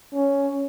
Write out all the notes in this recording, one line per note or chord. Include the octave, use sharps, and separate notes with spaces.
C#4